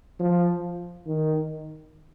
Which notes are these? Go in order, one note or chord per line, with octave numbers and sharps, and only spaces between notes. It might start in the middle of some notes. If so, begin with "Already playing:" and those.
F3
D#3